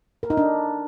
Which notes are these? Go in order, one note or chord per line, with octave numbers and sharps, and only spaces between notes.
A#4
D#4
D4